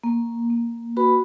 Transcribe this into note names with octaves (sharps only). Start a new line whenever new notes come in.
A#3
A#3
F#4 B4 B5